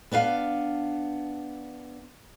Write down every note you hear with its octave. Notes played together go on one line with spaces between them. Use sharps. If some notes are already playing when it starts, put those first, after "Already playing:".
B3 D4 B4 F5